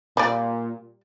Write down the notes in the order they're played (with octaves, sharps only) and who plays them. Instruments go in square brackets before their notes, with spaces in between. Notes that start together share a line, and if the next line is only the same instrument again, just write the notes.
[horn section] A#2 [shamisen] G3 D5